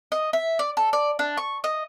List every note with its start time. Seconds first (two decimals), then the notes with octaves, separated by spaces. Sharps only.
0.12 D#5
0.33 E5
0.59 D5
0.77 A4
0.93 D5
1.19 D4
1.37 C#6
1.64 D#5